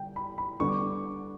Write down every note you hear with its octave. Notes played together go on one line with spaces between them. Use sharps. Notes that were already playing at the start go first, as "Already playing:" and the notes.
Already playing: D3 G3 G5
B5
B5
D3 G3 B3 D4 C#6
D6